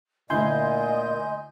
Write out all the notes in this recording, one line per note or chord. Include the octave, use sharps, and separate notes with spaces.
D2 A#2 D3 E4 D#5 G#5 C6 G6